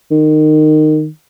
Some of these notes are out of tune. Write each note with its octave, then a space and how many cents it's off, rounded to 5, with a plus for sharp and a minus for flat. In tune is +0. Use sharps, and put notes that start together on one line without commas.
D#3 -20